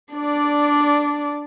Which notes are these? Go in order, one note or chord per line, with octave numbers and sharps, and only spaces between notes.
D4 D5